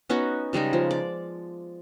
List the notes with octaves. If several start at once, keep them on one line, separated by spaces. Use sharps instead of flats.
B3 C#4 D#4 F#4
C#3 G3 G#3 D#4
F3
D5